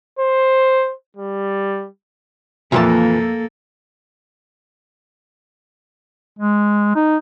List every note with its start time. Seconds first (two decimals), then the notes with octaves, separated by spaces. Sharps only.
0.19 C5
1.17 G3
2.72 F2 A#2 E3 A#3 A4 E5 A5
6.39 G#3
6.95 D#4